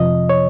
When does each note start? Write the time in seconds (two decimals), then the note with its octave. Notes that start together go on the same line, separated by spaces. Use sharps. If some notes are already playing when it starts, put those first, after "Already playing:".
Already playing: F2 C3 F3 D#5
0.29 C#5